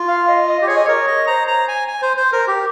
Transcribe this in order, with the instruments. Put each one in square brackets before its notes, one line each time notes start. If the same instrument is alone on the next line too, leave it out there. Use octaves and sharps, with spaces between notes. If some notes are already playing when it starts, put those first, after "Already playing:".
Already playing: [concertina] F4
[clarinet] F5
D#5
D#5
[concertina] G4
[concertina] G#4 [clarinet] C#5
[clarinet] D#5
[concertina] A#4 [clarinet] C#5
[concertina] D#5
[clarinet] C5 [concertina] A#5
[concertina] A#5
G#5
G#5
C5
C5
A#4
G4